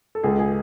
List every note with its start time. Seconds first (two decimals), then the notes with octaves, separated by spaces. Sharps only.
0.15 A4
0.23 C#2 G#4
0.39 G#4